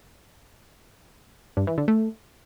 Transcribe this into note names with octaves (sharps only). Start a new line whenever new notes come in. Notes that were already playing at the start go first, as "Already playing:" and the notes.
G2
E3
D3
A3